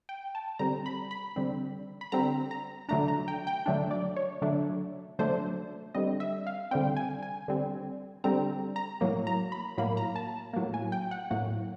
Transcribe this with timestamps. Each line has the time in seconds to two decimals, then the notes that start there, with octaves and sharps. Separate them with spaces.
0.09 G5
0.35 A5
0.59 D3 G3 C4 A#5
0.86 B5
1.11 B5
1.36 D3 G3 C4
2.01 B5
2.12 D3 G3 C4 A#5
2.51 A#5
2.89 D3 F#3 A3 D4 A#5
3.08 A#5
3.28 G5
3.47 G5
3.66 D3 F#3 A3 D4
3.91 D5
4.16 C#5
4.42 D3 F#3 A3 D4
5.19 D3 F#3 A3 D4 C5
5.95 D3 G3 C4 D#5
6.20 E5
6.47 F5
6.71 D3 G3 C4 G5
6.97 G#5
7.23 G#5
7.48 D3 G3 C4
8.24 D3 G3 C4 A#5
8.76 A#5
9.01 A2 F#3 A#3
9.27 A#5
9.52 B5
9.78 A2 F#3 A#3 B5
9.97 A#5
10.16 A5
10.53 A2 F#3 A#3
10.74 G#5
10.92 G5
11.11 F#5
11.31 A2 F#3 A#3 F#5